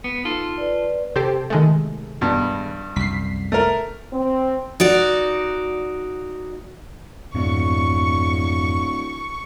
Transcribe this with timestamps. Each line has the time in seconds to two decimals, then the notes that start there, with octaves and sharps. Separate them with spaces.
0.04 B3
0.25 D#4 F4 A4
0.58 B4 D5
1.16 C3 G4 A4 C5
1.50 D#3 G#3 A3
2.21 G2 B2
2.96 C2 F#2 B6 C7
3.52 A3 A#4
4.13 C4
4.80 D#4 F#4 D5
7.34 D1 F2 G#2 B2 C#6